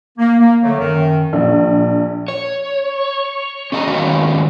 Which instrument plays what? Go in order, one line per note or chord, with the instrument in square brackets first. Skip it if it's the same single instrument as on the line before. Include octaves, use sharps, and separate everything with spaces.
[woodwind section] A#3
A#3
D3 F#3 A3
F#2 D#3
[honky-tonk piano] A#1
[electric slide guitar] C#5
C#4 G#4 D#5 F5 A#5
D#3 G#3 C#4 F4 F#4 C#5